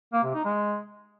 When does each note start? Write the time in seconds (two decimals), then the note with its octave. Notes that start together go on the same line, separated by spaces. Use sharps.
0.13 A#3
0.24 C3
0.34 D#4
0.45 G#3